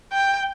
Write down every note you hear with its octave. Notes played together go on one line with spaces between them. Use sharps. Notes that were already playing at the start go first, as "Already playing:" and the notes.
G5